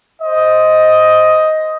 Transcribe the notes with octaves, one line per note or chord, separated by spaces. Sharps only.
C5 D#5